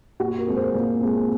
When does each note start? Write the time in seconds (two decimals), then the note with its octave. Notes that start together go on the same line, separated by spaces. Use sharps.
0.20 A#2 F#4
0.38 A#4
0.47 G#3 C4
0.56 C5
0.74 A#2
1.01 G#3 C4